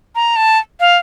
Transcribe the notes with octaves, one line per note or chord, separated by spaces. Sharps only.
A#5
A5
F5